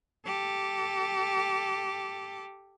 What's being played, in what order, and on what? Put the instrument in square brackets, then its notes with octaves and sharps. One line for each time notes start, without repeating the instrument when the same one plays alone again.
[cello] G4 A4